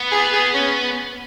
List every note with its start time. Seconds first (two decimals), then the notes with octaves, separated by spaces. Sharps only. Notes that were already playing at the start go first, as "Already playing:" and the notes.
Already playing: B3
0.12 G#4
0.33 G#4
0.54 C#4